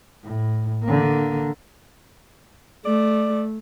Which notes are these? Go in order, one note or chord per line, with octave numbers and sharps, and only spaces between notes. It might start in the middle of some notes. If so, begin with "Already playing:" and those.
A2
D3 A#3
A3 D5